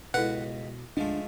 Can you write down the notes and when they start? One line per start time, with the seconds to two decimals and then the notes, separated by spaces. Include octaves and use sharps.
0.14 C#2 B2 E4 A4 B4 F#5 G5 B5
0.97 D2 G#2 F3 A3 D4